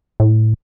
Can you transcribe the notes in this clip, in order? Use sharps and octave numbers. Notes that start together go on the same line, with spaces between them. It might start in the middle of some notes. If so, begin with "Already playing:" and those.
A2